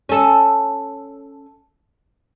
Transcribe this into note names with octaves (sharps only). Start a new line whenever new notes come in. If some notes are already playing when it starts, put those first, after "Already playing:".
C#4 A4